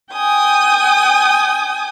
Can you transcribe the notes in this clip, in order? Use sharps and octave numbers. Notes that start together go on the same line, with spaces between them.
G5 G#5 D#6